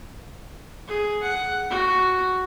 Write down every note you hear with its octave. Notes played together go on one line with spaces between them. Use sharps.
G#4
F#5
F#4